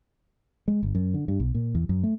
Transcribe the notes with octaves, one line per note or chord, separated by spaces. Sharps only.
G#3
G1
F#2
D3
G2
B1
A#2
E2
F#2
A3